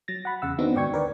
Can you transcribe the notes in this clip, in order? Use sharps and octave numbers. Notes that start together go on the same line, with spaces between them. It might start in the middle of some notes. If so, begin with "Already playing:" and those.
F#3 A6 A#6
F#5 B5
E2 C#3 F#5 E6
D#3 B3 C4 D4 D#4 F#4
G#2 D#3 D5 G5 C#6 G#6
D2 D3 A#4 B4 D5